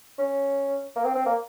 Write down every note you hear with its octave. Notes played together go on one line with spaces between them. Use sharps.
C#4
A#3
C4
C4
A#3